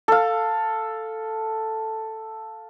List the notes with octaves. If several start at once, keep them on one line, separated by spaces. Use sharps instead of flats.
A4 F5